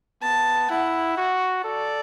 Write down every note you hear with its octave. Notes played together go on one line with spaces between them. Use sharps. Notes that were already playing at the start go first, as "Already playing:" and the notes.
B3 A5
E4 F#5
F#4
A4 D5